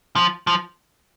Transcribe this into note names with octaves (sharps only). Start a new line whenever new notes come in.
F3
F3